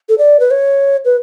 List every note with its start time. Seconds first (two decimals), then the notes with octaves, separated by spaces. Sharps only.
0.09 A4
0.18 D5
0.40 B4
0.51 C#5
1.05 B4